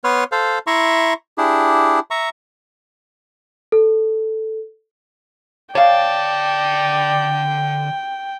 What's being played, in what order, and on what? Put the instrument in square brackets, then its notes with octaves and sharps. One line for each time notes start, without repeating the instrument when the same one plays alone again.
[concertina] B3 B4 C#5 C6 F6
A4 C5 F5
E4 E5 A#5 C6 C#6
D4 E4 G4 G#4
E5 A#5 C#6
[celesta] A4
[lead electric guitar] D3 A5 [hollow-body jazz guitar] C#5 F5 [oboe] D5 [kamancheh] G5